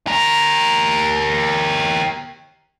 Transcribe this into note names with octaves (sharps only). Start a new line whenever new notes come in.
G4 A#4